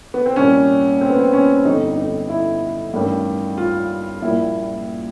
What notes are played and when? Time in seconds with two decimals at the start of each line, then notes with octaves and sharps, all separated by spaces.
0.14 B3
0.26 C4
0.36 C2 A#2 G3 C#4
1.01 C4
1.10 B3
1.19 C4
1.33 C#4
1.65 G1 F2 D3 G3 D#4
1.98 D#4
2.29 E4
2.93 A1 G2 D#3 G3
3.58 F4
4.22 A#1 A#2 G3 E4